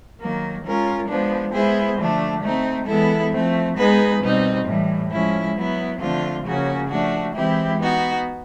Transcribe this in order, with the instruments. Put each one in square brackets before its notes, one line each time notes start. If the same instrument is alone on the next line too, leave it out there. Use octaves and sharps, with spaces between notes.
[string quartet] D#3 F#3 A#3
G#3 C#4 F4 A#4
F3 G#3 B3 D4
G#3 B3 E4 G#4 C5
D3 F3 A3 D4
A3 C4 D#4
E3 G#3 B3 E4 A4
F3 A3 C4
G#3 B3 D#4 G#4 B4
B2 G3 C4 D#4
A2 E3 G3
F3 G#3 C#4 E4
F#3 B3 E4
D3 F3 A3 C4 F4
C#3 F3 A#3 C#4 F#4
F3 A3 D4 F#4
E3 G#3 C4 E4 G4
B3 D#4 F#4